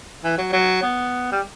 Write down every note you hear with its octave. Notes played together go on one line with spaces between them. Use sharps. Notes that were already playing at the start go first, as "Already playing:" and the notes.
E3
F#3
F#3
B3
G3